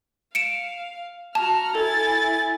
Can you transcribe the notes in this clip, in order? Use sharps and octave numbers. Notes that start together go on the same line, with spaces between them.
F5 C#7 D7 E7
F#4 A5 A#5 F6
E4 A4 G#5 A6